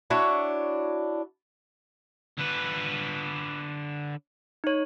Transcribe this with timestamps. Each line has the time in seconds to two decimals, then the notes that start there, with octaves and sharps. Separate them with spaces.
0.10 D4 E4 F#4 C#5
2.39 D3 B4
4.64 D#4 C#5